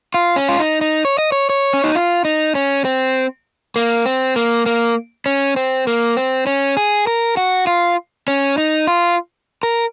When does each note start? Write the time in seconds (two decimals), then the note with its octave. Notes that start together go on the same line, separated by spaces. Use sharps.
0.14 F4
0.36 C#4
0.49 F4
0.59 D#4
0.81 D#4
1.05 C#5
1.18 D#5
1.32 C#5
1.49 C#5
1.74 C#4
1.84 D#4
1.95 F4
2.25 D#4
2.55 C#4
2.85 C4
3.76 A#3
4.06 C4
4.36 A#3
4.66 A#3
5.26 C#4
5.56 C4
5.87 A#3
6.17 C4
6.47 C#4
6.77 G#4
7.07 A#4
7.37 F#4
7.67 F4
8.28 C#4
8.58 D#4
8.87 F4
9.63 A#4